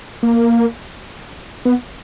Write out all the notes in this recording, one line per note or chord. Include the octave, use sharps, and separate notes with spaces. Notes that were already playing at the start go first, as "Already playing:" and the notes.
A#3
B3